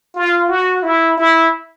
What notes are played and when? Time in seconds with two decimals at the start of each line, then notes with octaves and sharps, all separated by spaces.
0.15 F4
0.49 F#4
0.83 E4
1.17 E4